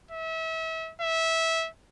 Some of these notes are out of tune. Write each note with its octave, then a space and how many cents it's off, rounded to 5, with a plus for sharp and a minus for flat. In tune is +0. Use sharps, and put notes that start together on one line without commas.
E5 -30
E5 -15